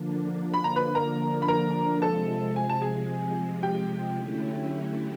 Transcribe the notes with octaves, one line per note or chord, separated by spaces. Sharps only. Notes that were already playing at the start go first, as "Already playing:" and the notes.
Already playing: D3 F3 A#3 D4
B5
A#5
B4 B5
A#4 A#5
B5
A#4 A#5
C3 F3 G#3 A4 A5
G#5
A5
G#4 G#5
G4 G5
D3 F#3 A3 C#4 E4